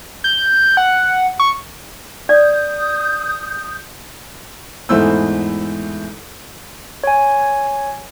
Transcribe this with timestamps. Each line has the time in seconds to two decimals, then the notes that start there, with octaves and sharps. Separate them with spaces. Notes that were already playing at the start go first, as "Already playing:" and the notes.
0.24 G6
0.77 F#5
1.40 C#6
2.29 D5 D#6 G6
4.89 E2 G#2 E3 A3 C5 E6
7.04 C#5 G#5